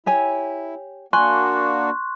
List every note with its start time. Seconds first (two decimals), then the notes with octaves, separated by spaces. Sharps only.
0.06 E4 G4 C#5 G#5
1.13 A#3 D4 F#4 G#5 C6 C#6 F#6